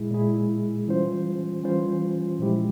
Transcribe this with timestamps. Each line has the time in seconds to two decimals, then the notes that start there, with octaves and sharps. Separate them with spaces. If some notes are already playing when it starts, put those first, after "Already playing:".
Already playing: A#2 G#3 E4 G#4
0.11 A#2 G#3 E4 G#4
0.88 E3 G3 C#4 F4 C5
1.63 E3 G3 C#4 F4 C5
2.39 A#2 F3 G#3 E4 G4